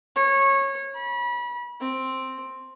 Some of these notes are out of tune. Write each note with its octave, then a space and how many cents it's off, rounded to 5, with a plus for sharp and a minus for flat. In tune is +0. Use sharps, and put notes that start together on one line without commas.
C#5 -20
B5 -30
C4 +5